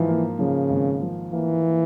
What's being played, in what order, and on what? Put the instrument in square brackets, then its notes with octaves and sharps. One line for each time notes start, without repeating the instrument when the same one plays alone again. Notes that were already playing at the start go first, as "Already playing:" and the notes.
Already playing: [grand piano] G#2 F3 [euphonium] E3
[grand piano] A#3
[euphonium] C#3 [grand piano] F3
[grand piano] G#1
F3
[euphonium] E3 [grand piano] A#3
[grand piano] A#3